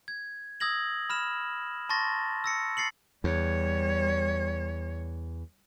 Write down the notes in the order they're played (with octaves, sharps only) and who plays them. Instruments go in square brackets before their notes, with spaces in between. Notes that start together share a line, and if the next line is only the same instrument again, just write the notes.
[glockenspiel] G#6
D#6 E6 G#6 A#6 F#7
B5 F6 E7
A5 C6 C#6 A6 A#6
E6 A#6 C#7
A6 C7 C#7 F#7
[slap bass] E2 [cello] G3 C#5